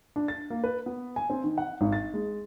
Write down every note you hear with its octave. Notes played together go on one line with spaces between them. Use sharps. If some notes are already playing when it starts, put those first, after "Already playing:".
D4
A6
A#3
B4
B3
G#5
C4
D#3
F#5
G#1
A6
G#3